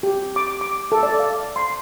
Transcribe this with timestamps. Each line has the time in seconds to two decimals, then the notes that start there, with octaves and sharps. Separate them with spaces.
0.03 G4
0.36 D6
0.61 D6
0.92 A4
1.03 D5
1.19 F5
1.56 C6